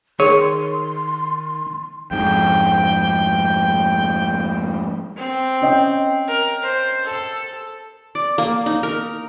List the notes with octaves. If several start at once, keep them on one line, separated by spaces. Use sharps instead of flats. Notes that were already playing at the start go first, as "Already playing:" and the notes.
D#3 G#4 C#5 C6
F2 G#2 G5
C4
C#4 D#5 G5
A#4
C5
A4
D5
A#3
D#4
A#4